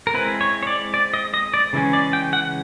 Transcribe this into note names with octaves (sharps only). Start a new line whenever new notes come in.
A#4
G#3 C4 E4 B4
C#5
C#5
D5
D5
D#5
D#5
D5
C#3 E3 G#3 C#4
D5
G5
F#5